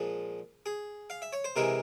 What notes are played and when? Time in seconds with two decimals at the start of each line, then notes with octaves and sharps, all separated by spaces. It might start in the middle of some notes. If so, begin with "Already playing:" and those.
Already playing: A#2 F3 G#3
0.66 G#4
1.10 F5
1.22 E5
1.33 C#5
1.44 C5
1.56 C3 E3 G#3 A#4